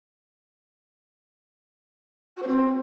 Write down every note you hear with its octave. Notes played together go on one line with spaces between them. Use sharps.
F#4
C5
C4